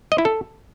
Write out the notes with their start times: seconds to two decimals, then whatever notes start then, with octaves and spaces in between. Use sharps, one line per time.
0.12 D#5
0.18 E4
0.25 A4